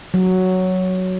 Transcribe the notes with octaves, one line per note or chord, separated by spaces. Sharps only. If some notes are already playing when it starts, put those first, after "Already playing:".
F#3